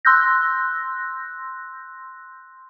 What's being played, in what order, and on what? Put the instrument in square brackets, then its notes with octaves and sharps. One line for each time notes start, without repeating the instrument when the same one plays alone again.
[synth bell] C6 E6 F#6 G6 A#6